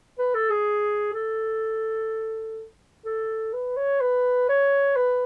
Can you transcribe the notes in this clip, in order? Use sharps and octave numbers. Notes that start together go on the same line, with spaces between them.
B4
A4
G#4
A4
A4
B4
C#5
B4
C#5
B4